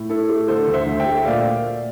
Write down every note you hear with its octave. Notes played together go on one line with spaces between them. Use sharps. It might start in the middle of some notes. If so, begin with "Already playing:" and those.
Already playing: A2
E4 A4
A3
D3 A4 C5
D2
C5 E5
D2
E5 G5
A3
A#2 D5 F5